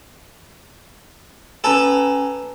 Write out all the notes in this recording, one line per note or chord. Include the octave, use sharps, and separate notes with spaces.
C#4 A4 B4 G#5 A#5